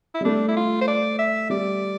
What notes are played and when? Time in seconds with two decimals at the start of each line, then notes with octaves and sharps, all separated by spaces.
0.14 E4
0.21 G3
0.25 A3 D4
0.48 E4
0.56 F4
0.81 C5
0.88 D5
1.18 E5
1.50 G3 D5